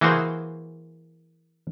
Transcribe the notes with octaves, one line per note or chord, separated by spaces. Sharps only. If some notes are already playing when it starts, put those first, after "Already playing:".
E3 A#3 F#4 G#4 C5